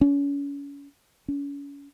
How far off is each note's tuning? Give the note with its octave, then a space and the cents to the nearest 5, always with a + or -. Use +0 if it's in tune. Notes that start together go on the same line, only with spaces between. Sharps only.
C#4 +35
C#4 +35